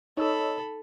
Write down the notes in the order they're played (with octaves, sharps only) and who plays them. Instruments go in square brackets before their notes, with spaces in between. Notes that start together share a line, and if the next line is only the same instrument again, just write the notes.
[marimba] D#4 [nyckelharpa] A4 B5 [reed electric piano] C#5 D#5 E6